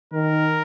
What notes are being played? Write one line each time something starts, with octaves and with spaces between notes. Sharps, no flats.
D#3 A#4